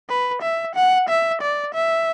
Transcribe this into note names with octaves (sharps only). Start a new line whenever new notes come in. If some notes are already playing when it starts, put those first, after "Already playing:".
B4
E5
F#5
E5
D5
E5